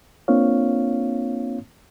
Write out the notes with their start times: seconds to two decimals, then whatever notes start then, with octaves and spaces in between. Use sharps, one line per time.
0.28 A#3 C4 D4 F4 C#5 F5